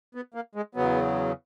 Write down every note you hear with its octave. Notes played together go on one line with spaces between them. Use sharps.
B3
A#3
G#3
E2 C#3 F#3 B3